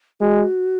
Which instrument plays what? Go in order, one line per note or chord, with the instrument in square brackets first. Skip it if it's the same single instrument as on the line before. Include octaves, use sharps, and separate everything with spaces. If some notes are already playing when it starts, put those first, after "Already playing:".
[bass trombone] G#3 [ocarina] F#4